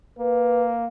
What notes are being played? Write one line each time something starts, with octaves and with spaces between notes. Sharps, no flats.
A#3 B4